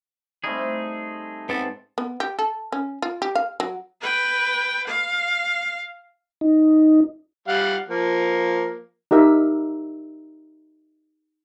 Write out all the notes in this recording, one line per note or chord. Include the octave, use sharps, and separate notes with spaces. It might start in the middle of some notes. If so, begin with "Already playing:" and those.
G3 A3 C4 D#4 G#4
G#2 B3 C4 A5
B3
G4
A4
C#4
F4
G4
F5
F#3
B4 G5
F5
D#4
G3 F5 F#5
F3 A#3
D#4 G4 A#4 E5